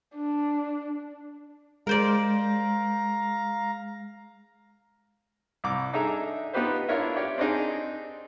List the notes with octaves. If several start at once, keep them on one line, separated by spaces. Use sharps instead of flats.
D4
G#3 A#4 C5 D5 F5 A#5
C2 D6
D4 D#4 G#4 A4 E5 A#5
B3 D#4 F4 G4 B4 C5
D4 E4 F4 A#4 C#5 E5
G4 C#5 D5
C4 D4 D#4 G#4